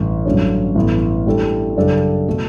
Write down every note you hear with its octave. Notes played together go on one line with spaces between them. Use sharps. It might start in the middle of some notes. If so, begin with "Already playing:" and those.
Already playing: A1 G2 E3
A1 G2 D3 F#3 C#4
A1 G2 E3 B3
A2 G3 D4 A4
F#2 C#3 G3 D4 A4
B2 A3